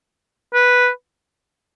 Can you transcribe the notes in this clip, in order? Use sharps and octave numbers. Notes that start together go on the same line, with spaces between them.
B4